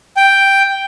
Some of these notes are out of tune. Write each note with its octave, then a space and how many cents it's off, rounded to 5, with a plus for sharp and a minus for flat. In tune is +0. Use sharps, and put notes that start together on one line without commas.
G5 +0